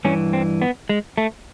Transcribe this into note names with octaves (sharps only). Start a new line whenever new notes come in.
G2 E3 C#4
C4
B3
G#3
A3